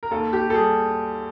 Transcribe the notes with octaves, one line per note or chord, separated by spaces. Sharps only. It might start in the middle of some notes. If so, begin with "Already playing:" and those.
A#4
D#2 A4
G4
A4
G3 G#4